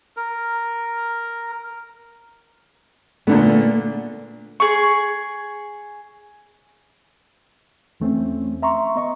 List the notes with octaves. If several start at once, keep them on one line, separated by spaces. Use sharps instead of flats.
A#4
A#2 D3 A3 B3
G#4 C#6
E2 E3 A3 C4 C#4
E5 A#5 C6 C#6
B3 D#5 C#6